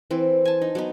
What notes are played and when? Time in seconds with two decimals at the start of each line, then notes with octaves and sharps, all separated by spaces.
0.11 E3 C4 C5
0.45 G#5 A5
0.62 D#4
0.75 F#3 B3 D#4